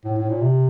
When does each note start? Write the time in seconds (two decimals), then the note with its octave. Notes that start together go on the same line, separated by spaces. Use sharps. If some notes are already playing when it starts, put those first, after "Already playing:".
0.05 A2
0.18 A2
0.29 A#2
0.41 C3